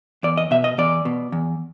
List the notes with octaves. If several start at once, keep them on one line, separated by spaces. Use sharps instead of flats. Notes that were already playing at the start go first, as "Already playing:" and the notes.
E2 D5
D#5
B2 E5
D#5
E2 D5
B2
E2